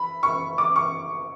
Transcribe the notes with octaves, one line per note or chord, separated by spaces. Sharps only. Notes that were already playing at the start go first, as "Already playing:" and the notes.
Already playing: B5
C#6
D6
C#6